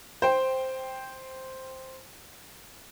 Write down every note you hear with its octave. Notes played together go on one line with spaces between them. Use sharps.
C5 G5